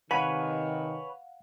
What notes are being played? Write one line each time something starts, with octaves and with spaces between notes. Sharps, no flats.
C3 D#3 B4 C#5 F5 F#5 G#5 B5